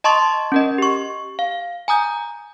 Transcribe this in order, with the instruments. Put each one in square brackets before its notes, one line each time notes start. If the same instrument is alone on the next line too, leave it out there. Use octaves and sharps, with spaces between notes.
[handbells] D#5 A5 C6 C#6 D#6 A6
C#4 A#4 D#5
G4 C#6
F5
G#5 A#5 D#6 G6